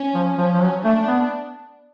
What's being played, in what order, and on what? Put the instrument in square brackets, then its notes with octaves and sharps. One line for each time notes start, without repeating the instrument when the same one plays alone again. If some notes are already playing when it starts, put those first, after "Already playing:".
Already playing: [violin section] C#4
[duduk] F3
[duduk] F3 [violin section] C#4
[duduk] F3
F#3
[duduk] A3 [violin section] D4
[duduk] B3